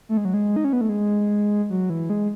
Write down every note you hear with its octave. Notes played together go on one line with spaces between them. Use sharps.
A3
G#3
F#3
G#3
D#4
C#4
B3
A3
G#3
F#3
E3
G#3